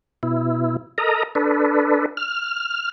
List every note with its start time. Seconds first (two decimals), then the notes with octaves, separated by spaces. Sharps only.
0.23 B2 E4
0.98 A4 A#4 D#5 A#5
1.35 D4 A4 B4
2.17 F6